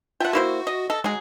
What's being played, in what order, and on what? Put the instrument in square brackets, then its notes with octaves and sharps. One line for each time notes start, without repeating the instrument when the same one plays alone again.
[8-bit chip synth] F4 E5 A5 [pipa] F#5 G5
[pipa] A#3 E4 C5 [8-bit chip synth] F#4
[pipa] D#5
[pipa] A4 [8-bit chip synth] D#5
[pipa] F#3 G#4 [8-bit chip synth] G#3